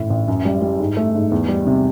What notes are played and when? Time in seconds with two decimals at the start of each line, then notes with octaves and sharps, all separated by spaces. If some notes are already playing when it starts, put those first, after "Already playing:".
Already playing: A1 A2
0.10 A1
0.28 F#2
0.45 G3
0.62 G3
0.80 G#2
0.97 A3
1.15 G#2
1.32 E2
1.48 G3
1.67 C3